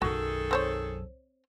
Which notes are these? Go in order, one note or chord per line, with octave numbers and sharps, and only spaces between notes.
B1 F#2 D#3 F#4 G#4 A4
C4 C5 C#5